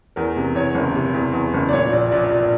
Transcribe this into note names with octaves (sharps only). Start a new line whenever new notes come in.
E2 A#4
C3
E2 C#5
F#1
C3
E2
E2
F#1
D5
A#2 C#5
A#1 D5
A#1 D5
A#1 D5